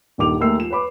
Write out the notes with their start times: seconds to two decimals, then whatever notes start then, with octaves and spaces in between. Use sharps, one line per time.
0.18 D#1 G2 D#3 G4 D6 F7
0.40 D#2 G#3 A3 A#4 E6 C7
0.59 F3 E7
0.70 B4 C#5 B5 D6